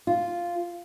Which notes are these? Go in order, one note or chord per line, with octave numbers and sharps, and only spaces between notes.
F4